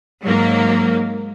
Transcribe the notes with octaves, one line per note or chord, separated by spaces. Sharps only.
G#2 F#3 A#3